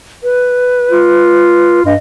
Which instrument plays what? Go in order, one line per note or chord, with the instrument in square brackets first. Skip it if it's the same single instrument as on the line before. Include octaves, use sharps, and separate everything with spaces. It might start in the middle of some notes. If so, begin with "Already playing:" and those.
[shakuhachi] B4
[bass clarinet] F4
[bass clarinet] G2 [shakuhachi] D#5